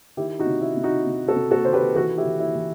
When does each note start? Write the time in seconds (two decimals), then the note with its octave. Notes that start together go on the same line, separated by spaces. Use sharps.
0.17 D#3 E4 G4
0.39 D#4 F#4
0.46 C3
0.61 E4
0.77 C3
0.83 D#4 F#4
1.06 C3
1.28 F#4 A4
1.36 C3
1.51 F#4 A4
1.65 D#3 C5
1.73 G4 B4
1.96 E3 F#4 A4
2.17 E4 G4
2.25 E3
2.40 E4
2.55 E3